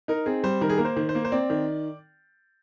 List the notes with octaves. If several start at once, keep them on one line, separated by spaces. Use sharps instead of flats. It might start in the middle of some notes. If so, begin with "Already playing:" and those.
D#4 A#4
C4 G#4
G3 C5
D#3 A#4
G#4
A#3 A#4
C5
D#3
C5
A#3
C5
C4 D5
D#3